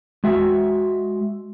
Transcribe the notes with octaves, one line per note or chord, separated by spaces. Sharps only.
G#3 F#4 E5